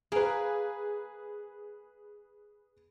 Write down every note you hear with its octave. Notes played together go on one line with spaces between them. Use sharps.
A#3 G#4 B4